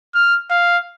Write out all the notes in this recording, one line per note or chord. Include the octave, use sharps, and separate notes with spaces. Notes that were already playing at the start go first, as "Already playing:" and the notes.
F6
F5